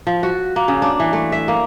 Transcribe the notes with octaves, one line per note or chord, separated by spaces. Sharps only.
F3
F#4
A#3
C#3
D4
E3
A3
E5
A#3